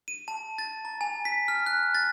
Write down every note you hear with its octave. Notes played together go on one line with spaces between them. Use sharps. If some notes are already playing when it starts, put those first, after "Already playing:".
D#7
A5
A6
A#5
G#5
B6
F6
F#6
A6